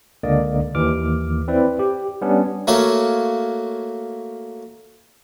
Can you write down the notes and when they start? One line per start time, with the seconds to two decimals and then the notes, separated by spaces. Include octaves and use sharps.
0.23 C#2 D3 A#3 D5 D#5
0.75 D#2 E3 D6 F6
1.48 C4 E4 B4 D5
1.79 G4
2.21 G3 B3 C#4 D4
2.67 A3 A#3 F#4 C#5 F5